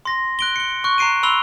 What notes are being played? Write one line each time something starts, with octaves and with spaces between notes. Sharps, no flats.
C6 A#6
F#6 D7 G7
C#7 G7
C#6 F#6
A#5 F#6 C7 D7 D#7
B5 C6 E6 F7 G7